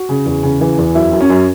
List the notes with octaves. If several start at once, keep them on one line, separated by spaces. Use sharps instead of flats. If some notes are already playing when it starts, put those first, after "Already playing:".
Already playing: F#4
C#3
E2
C#3
E3
E2
F#2 E4
F#2
C#4
F#2